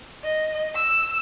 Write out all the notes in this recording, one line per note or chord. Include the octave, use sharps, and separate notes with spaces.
D#5
E6